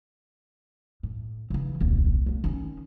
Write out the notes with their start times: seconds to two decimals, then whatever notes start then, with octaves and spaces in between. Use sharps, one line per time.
1.03 A2
1.50 C#3 E3
1.80 D#1 C2
2.26 A3 B3
2.44 D#3 C#4